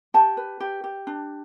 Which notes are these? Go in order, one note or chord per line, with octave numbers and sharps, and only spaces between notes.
G4 A5
B4
G4
G4
D4